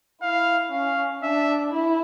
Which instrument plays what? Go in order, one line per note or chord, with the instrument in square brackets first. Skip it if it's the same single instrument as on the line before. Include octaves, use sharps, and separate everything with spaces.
[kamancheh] E4 [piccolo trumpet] F5
[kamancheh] C#4 [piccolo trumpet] F5
[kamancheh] D4 [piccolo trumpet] E5
[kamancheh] E4